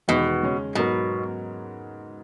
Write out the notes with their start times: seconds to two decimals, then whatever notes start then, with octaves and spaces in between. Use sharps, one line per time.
0.08 E2 B2 D#3 G#3 B3 D#4
0.42 C#3 G#3 C#4
0.75 G#2 B2 F#3 B3 F#4 A#4